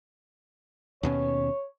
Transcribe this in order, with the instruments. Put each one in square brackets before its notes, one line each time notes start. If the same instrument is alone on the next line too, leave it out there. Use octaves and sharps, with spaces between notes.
[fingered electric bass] D#2 B2 C#4 [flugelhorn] C#5